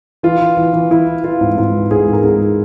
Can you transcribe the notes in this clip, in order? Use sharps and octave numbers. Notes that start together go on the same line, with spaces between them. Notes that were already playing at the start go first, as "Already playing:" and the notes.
E3 F4
E3
E3
E3
E3 E4
E3
E3 F4
G#2
G#2 F4
E3
G#2 G#4
G#2
A#4
G#2 G#4